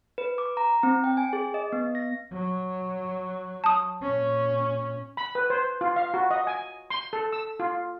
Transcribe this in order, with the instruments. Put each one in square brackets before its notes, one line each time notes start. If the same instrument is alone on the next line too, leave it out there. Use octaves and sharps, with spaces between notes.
[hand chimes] B4
D6
A#5
C4
G5
G#5
G#4
D#5
B3
A#6
[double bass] F#3
[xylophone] A5 D#6
[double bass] A#2 C#4
[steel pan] B5
B4
C5
F4
F5
F#4
D#5
G#5
C6
A4
E6
F4